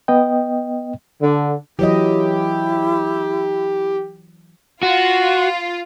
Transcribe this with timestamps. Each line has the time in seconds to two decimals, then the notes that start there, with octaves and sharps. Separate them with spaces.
0.08 B3 D#5 G5
1.22 D3
1.79 E3 F#3 E4 G4 D#5
4.83 F4 F#4